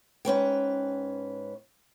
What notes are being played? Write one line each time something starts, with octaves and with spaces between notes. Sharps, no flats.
G#2 C#4 B4 G5